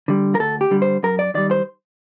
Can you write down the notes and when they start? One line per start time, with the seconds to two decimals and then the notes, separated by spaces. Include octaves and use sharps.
0.08 D3 G3
0.35 A#4
0.39 D2 A4
0.61 G4
0.71 D3 G3
0.82 C5
1.03 F#2 A#4
1.19 D5
1.34 D#3 G3 D5
1.51 C5